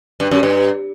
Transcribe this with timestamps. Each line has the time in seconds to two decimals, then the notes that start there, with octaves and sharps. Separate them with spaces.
0.20 G2
0.31 F#2
0.43 G2